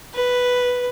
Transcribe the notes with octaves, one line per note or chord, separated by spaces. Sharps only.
B4